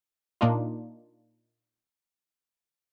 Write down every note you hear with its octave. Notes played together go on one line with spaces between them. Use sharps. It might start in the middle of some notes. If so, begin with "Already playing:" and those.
A#2 A#3 D4 D#4 F4